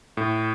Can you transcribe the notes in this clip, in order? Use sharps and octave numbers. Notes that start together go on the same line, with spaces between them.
A2